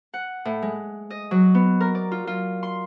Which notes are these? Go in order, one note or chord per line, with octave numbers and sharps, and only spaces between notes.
F#5
A2
G#3
D#5
F#3
B3
A#4
D5
F4
F4
C6